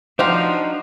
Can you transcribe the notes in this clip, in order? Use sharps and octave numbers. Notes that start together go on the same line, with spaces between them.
F3 D4 D#4 F#4 G4 C5 F5 A#5